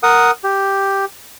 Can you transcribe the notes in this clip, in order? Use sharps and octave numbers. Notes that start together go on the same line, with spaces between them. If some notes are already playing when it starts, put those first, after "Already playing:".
A#4 F#5 D#6
G4